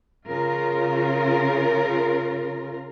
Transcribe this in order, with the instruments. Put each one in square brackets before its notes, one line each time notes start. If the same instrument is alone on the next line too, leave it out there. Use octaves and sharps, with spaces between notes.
[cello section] C#3 F4 A#4